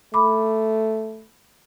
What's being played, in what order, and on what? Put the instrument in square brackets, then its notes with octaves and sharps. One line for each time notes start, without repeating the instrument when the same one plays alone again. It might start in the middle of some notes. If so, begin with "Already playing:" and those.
[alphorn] A3 [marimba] B5 D6